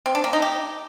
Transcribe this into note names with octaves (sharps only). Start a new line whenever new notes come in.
C4
D4
A#3
D#4
G4